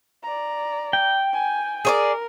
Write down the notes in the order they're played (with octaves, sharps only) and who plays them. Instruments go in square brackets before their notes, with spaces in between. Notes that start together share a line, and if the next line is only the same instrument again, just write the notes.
[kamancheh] D5 A#5
[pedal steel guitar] G5
[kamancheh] G#5
[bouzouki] G#4 C#5 D5 [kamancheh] A#4